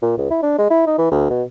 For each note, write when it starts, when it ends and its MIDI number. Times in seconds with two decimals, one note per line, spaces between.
0.02 0.14 46
0.18 0.29 37
0.30 0.39 64
0.43 0.54 62
0.58 0.68 56
0.70 0.82 64
0.87 0.98 63
0.98 1.11 52
1.11 1.29 38
1.30 1.43 47